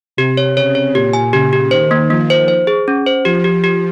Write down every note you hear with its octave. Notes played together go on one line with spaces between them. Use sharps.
C3 G4
C#5
C#3 C#5
C#5
A#2 G4
G#5
C#3 G4
G4
D#3 C5
A#3
F3 A#3
C5
C5
G#4
C#4
C5
F3 G4
G4
G4